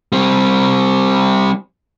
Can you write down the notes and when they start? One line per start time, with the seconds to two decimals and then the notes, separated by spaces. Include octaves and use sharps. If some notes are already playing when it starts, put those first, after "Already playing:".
0.12 G3 C4